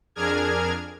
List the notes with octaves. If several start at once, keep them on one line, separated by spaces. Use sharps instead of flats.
F2 D4 G#4 A#4 F6 G#6